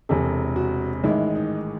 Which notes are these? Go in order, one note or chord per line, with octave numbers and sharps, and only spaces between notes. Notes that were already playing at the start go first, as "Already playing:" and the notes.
E1 E2 C3 A4
F#4
A1 G#2 D#3 G#3 E4
D#4